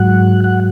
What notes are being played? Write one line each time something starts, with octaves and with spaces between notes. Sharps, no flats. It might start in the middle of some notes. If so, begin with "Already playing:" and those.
Already playing: G#2 F#3 F#5
F#5